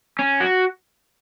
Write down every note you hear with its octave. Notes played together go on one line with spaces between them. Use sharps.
C#4
F#4